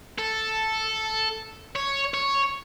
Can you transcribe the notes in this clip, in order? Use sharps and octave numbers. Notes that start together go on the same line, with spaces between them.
A4
C#5
C#5